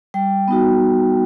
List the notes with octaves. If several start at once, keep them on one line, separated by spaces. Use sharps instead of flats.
G3 G5
B3 D#4 F#4